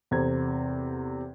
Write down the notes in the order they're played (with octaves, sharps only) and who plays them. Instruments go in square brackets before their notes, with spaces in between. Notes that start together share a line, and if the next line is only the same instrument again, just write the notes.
[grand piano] E2 C3 A4 C5 A#5 G#6